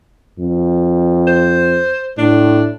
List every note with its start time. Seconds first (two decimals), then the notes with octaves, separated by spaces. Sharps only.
0.39 F2
1.27 C5
2.18 A2 D4